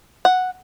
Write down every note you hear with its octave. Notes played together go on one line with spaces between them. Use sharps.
F#5